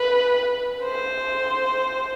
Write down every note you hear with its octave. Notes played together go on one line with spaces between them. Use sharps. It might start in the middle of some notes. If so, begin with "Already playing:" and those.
Already playing: B4
C5